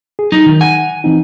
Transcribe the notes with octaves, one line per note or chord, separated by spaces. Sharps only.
G#4
F#3 D#4
D#3
F#5 G#5
E3 C4 D#4